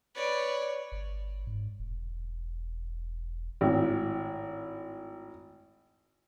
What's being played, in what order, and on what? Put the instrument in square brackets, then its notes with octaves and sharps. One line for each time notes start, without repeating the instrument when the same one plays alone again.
[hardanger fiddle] B4 C#5 [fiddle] D5
[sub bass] G1
G#2
E1
[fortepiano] G#1 A2